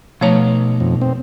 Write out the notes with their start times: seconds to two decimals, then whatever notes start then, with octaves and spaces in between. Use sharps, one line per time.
0.21 B2 F3 A3 D#4 C#5 A#5
0.80 F2
1.01 C4